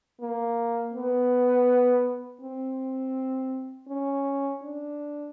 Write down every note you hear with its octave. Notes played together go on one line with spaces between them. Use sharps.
A#3
B3
C4
C#4
D4